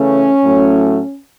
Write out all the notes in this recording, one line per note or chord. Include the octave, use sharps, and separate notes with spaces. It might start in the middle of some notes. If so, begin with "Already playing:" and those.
Already playing: C#3 E3 A3 C#4
A2 F#3 A3